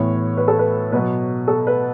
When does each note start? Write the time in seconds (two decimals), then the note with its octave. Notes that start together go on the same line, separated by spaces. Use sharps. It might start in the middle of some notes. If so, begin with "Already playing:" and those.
Already playing: A2 E3 B3 C#5
0.37 B4
0.48 A4
0.59 B4
0.92 B2 F#3 B3 B4
1.48 A4
1.67 B4